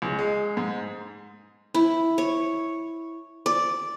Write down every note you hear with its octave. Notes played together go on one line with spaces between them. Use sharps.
C#2
G#3
G#2
E4
C#5
D5